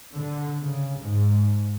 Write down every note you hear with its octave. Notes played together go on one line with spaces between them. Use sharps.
D3
C#3
G#2